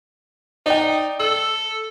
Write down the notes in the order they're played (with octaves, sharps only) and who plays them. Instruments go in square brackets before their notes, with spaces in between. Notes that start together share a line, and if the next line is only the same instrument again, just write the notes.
[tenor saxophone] D#4 [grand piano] D5 G5
[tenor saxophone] A4 [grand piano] E6